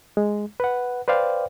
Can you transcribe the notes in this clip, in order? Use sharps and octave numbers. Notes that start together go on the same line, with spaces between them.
G#3
B4 F#5
B4 C5 D5 F5 G5